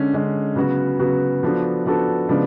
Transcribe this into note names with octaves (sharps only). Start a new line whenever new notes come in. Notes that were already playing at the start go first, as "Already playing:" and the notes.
Already playing: D3 G#3 C#4
D3 G#3 C#4
C#3 F#3 B3 F#4
C#3 F#3 B3 F#4
F3 B3 D4 F#4 A4
F3 B3 D4 F#4 A4
C#3 F3 G#3 B3 D4